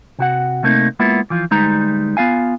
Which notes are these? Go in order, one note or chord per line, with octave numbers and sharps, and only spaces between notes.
C3 F#4 F#5
C3 A3 A#3 C4 D#4
G#3 A#3 B3 E4 F4
E3 F3 F4
D2 G3 G#3 D#4 B4 A#5
B3 F4 F5 G#5